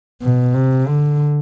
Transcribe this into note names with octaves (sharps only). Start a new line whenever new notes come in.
B2
C3
D3